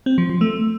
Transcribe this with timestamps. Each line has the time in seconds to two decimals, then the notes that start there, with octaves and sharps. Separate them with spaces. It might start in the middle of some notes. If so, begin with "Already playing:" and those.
0.06 C4
0.18 F3
0.29 F3
0.41 A3